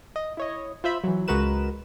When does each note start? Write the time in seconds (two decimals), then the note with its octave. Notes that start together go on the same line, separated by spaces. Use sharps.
0.16 D#5
0.37 E4 C#5 D#5
0.84 F4 C5 E5 B5
1.04 E3 F#3
1.28 C#2 G#3 F#4 A#4 B4 E7